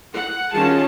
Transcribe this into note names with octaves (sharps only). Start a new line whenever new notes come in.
F#5
D#3 G3 C#4 F4 G#4 A5